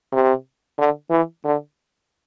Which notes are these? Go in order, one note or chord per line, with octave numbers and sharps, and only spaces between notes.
C3
D3
E3
D3